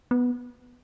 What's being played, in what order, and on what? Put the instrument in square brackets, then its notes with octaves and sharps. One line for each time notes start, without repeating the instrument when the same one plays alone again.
[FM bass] B3